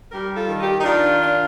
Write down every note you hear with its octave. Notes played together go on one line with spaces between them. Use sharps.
G3 G4 A#4
F4 A4
D#3
D#4 G4
D#4
D#3 D4 F4
D4